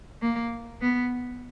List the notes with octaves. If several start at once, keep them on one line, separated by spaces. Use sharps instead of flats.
A#3
B3